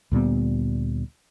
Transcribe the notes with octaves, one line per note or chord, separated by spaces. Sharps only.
D2 A#2 G3 B3